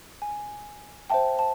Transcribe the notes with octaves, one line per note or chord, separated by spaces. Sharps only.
G#5
C5 E5 G5 A5
A5